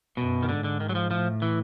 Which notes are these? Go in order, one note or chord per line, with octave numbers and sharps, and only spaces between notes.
F#2 B2
D#3
G#2 D3
D3
D#3
F#3
F3
A2 F3
E3